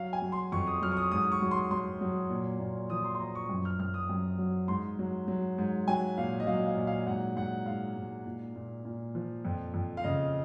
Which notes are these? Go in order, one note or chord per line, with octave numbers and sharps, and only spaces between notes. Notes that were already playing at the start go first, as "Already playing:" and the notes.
Already playing: F#3 F5
G#5
F#3
C6
F2 C#6
D#6
F#3 F6
C#6
D#6
G#2 D#6
C#6
F#3
C6
F#3 C6
F#3
A#2
A#2
F3 D#6
C6
C6
F3 A#5
C#6
F#2
F6
F#2 F6
D#6
F#2
F#3
G#2 C6
F#3
F#3
G#2
F#3 G#5
A#2 F5
D#5
F#3 F5
F5
A#2
F5
G#2 F#5
G#2 F#5
G#2 F5
G#2
A#2
A#2
A#2
F3
F2
F2
F5
C#3 D#5